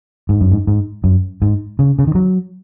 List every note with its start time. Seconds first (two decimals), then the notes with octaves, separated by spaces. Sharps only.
0.29 G#2
0.41 F#2
0.52 G#2
0.67 G#2
1.04 F#2
1.42 G#2
1.79 C#3
1.99 C#3
2.07 D#3
2.15 F#3